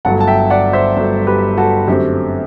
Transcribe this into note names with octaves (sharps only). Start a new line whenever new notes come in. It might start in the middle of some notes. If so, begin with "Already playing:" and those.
G1 G2 F#3 A3 F#5 A5
A5
E5 G5
D5 F#5
C5 E5
G1 G2 F#3 A3
G4 B4
F#4 A4
F#2 D3 A3 C4 G4